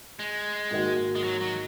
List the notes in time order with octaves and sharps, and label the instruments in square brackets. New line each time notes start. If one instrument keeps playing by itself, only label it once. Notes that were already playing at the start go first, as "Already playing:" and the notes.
[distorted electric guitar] G#3
[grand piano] G#2 D#3 A#3 D#4 F#4
[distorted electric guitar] G#3
F#3
F#3